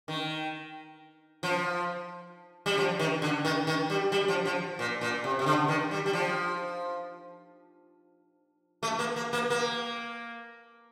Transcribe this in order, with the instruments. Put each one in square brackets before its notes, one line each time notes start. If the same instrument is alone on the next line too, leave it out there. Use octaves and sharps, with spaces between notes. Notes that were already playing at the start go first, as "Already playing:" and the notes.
[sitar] D#3
F3
G3
F3
D#3
D3
D#3
D#3
G3
G3
F3
F3
A#2
A#2
C3
C3
D3
D#3
G3
G3
F3
A3
A#3
A#3
A#3
A#3